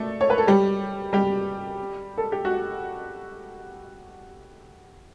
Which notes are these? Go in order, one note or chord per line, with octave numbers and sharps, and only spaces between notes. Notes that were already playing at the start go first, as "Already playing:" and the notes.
Already playing: A3 A4 D5
C#5
B4
A4
G3 G4
G3 G4
A4
G4
F#4